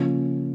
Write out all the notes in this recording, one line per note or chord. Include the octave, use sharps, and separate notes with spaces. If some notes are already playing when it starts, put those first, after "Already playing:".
Already playing: C#3 F3 A#3 C#4 F4